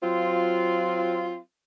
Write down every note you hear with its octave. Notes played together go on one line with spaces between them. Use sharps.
F#3 C4 F4